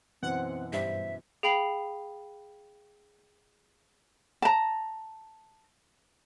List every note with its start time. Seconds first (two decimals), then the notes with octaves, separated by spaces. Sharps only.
0.23 F#2 B2 E3 C4 F#5
0.73 G2 C5 E5
1.43 G#4 F5 G5 B5 C7 F#7
4.42 A5 A#5